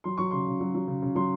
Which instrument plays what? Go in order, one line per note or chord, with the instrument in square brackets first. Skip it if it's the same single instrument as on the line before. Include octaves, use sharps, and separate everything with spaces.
[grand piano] F#3 C6
F#3 C#6
C#3 C6
C#3
F#3
F#3
C#3
C#3
F#3 C6